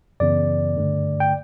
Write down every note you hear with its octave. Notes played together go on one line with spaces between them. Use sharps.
F#2 C#3 E3 B3 D5
G2 D3 A3
G5